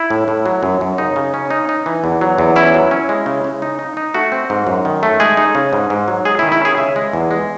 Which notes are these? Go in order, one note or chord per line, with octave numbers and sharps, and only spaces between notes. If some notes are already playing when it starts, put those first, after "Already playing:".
Already playing: E4
A2
A2
F#3
F#2
F#2
C#3 D#4
C#3
C#4
D#4
D#4
E3
E2
F#3
E2
C#4 E4
F#3
C#4
G#3
C#3
C#3
D#4
D#4
D#4
A3 F#4
C4
G#2
F#2
D#3
A3
G#3 G#4
D#4
C#3
G#2
G#2
F#3
G#3 G#4
D#3 E4
E4
C#4 G#4
C#3 E5
G#3
E2
G#3